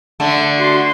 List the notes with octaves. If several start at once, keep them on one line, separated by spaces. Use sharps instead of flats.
D3 A3
F#4 C6